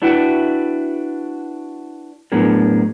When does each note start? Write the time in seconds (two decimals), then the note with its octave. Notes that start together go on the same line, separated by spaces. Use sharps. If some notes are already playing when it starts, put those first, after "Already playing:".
0.02 D4 E4 F#4 B4 E5 G5
2.32 A2 F#3 B3 D4 G#4 A#4